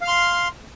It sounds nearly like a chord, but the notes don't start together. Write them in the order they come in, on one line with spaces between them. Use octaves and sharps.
F5 F6 C6